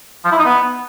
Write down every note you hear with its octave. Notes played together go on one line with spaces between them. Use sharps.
F3
E4
D#4
B3